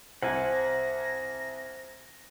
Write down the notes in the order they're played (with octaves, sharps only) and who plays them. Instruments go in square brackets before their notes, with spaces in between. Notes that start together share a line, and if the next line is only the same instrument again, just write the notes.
[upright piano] C2 [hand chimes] C5 [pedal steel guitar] F#5 G#5 [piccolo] A#6